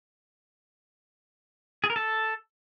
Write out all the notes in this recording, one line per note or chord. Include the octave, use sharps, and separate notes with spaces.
G#4
A#4
A4